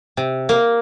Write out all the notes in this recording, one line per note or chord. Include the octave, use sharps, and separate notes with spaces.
C3
A#3